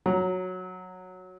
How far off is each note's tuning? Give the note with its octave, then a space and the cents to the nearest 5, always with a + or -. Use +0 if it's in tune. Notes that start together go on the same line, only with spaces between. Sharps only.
F#3 -10 A#5 +0